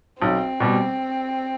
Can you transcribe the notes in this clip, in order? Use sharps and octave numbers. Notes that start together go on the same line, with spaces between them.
B1 C4
B2 G3